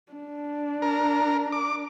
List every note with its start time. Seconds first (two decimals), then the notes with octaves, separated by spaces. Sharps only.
0.12 D4
0.82 A#4
1.52 D6